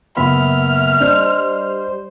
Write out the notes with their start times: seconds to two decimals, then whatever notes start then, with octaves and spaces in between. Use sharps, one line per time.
0.17 F#1 B3 E5 B5 F6
1.00 G3 D4 C5 D#5